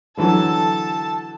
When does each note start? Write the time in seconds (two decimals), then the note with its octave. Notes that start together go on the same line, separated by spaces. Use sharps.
0.17 D3 E3 F#3 A4 A5